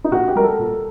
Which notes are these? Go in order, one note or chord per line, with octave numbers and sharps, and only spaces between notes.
D#4
A#2 F#4
G4
G3 A#4
A4
A#2